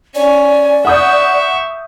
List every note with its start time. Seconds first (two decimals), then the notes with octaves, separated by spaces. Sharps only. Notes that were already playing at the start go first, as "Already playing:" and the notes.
0.15 C#4 D5 G#5
0.85 E5 F#5 C#6 D#6 G6